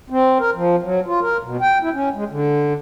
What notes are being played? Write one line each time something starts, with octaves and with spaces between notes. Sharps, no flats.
C4
A#4
F3
F#3
F4
A#4
B2
G5
E4
C#4
G#3
D3